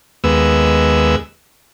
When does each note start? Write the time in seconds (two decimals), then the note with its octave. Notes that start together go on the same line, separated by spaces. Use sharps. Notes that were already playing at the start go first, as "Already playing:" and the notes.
0.24 D#2 G#3 B3 E6